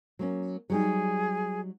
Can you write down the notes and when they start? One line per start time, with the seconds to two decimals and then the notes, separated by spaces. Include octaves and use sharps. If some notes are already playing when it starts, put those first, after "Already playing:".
0.19 F#3 A#3 C#4
0.70 F#3 G3 D#4 G#4